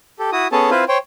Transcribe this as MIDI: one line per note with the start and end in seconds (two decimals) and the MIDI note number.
0.19 0.31 67
0.19 0.31 69
0.32 0.48 64
0.32 0.48 66
0.32 0.48 87
0.52 0.70 59
0.52 0.70 61
0.52 0.70 68
0.52 0.70 69
0.52 0.70 73
0.52 0.70 81
0.70 0.84 60
0.70 0.84 64
0.70 0.84 65
0.70 0.84 71
0.70 0.84 72
0.88 0.98 72
0.88 0.98 73
0.88 0.98 79